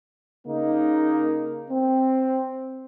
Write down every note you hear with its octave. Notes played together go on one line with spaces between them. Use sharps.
C#3 A#3 D#4
C4